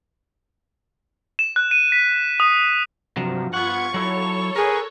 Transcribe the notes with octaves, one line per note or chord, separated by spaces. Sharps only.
E7
F#6
D#7
B6
D#6
G2 C3 F3 F#3
B3 F4 F#5 C#6 G#6 C#7
F#3 E4 A4 C#5
G#4 A#4 B4